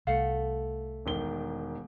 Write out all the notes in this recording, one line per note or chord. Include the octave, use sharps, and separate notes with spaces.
C2 A3 F5 F#5
E1 D#3 G7